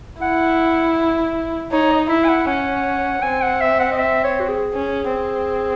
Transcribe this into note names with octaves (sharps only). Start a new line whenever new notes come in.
E4 F#5
D#4 C#5
D#5
E4 E5
G#5
F#5
C#4 F#5
C4 G#5
F#5
E5
F#5
D#5
E5
C#5
F#4
G#4
C#4
C4